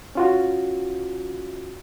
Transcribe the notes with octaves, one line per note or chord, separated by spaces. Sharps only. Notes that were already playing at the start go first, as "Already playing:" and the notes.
C#4 F4 F#4